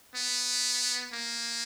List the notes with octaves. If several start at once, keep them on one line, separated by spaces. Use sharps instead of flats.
B3
A#3